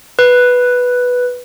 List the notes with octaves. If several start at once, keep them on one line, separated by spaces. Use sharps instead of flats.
B4